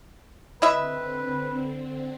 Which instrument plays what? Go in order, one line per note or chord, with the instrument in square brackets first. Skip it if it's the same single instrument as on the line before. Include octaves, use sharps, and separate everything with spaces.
[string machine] D3 C4 [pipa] E4 D#5 E5 [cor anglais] B4